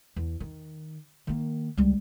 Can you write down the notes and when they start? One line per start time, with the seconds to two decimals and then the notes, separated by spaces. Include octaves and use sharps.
0.16 E2
0.40 D#3
1.27 D#3 A#3
1.77 C#2 G3